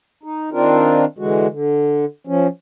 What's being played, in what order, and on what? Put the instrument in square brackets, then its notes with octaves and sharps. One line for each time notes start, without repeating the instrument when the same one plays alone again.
[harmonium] D#4
D#3 C4 D4 F4 A#4
D3 E3 G#3 F#4
D3
F3 C#4